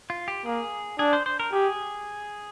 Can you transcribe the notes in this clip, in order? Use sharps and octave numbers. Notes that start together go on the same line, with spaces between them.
F4
G4
A#3 G#4
D4 G#4
C5
C5
A#4
G4 G#4